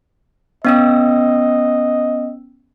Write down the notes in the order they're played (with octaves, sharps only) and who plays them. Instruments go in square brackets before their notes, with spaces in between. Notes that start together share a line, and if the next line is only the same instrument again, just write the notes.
[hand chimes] B3 C#4 E6 [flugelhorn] D#5